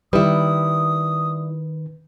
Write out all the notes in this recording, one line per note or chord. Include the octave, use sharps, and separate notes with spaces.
D#3 G3 E4 B4 D#6